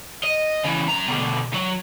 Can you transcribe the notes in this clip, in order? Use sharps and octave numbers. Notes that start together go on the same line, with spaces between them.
D#5
C#3 E3
F#2 A#5
B2 D3
F#3